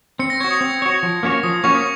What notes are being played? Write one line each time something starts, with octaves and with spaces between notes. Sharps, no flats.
C4 C#7
A#6
F#4 C#5 G#6
D#6
C4
F#4 C#5
F3
A#3 C#4 F#4 C#5
F3 D#6
A#3 C#4 F#4 C#5 C#6
D#6